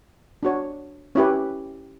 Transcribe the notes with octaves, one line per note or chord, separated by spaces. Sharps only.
D4 F#4 C#5
C#4 E4 G4 B4 C#5